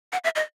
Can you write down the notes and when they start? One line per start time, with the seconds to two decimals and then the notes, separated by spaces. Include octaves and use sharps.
0.13 F#5
0.24 E5
0.36 D#5